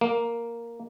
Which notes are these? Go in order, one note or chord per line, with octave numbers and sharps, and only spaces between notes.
A#3